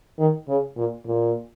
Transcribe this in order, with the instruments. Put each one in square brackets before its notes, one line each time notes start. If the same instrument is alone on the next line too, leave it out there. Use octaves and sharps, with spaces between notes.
[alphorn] D#3
C#3
A#2
A#2